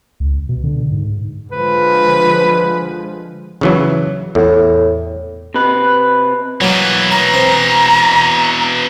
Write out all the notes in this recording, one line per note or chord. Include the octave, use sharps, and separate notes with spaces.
C#2
B2
D3
G#2
D3 F3 G#3 B4
C#3 E3 F#3
E2 A2
C3 B4
B2 E3 F#3 A#3
A#5
C4